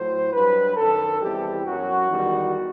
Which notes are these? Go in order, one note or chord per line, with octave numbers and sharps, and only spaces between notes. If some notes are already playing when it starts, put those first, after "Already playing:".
Already playing: A2 F#3 C5
G2 F#3 B4
F#2 D#3 F#3 A4
E2 C3 E3 G3 G4
F#2 F#3 F#4
E2 D#3 G3